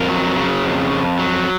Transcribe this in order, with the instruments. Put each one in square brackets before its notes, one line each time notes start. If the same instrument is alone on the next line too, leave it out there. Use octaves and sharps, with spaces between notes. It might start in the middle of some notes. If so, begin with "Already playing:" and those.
Already playing: [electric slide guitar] F2 A#4
F#3
C#3
F2
F2
F#3